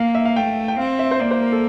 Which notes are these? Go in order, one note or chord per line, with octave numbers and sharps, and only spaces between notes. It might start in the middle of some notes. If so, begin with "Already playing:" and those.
Already playing: A#3 F5
E5
F5
A3 G5
G5
C4 F5
E5
C5
A#3 D5
C5
A#4
A4